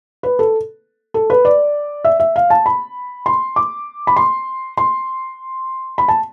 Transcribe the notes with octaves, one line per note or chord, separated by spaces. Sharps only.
B4
A4
A4
B4
D5
E5
E5
F5
A5
B5
C6
D6
B5
C6
C6
B5
A5